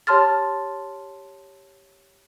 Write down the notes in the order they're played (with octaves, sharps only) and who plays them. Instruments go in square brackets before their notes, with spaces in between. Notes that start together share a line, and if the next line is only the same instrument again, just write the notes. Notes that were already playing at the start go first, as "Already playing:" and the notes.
[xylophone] G4 C#5 A5 C6 F6 A6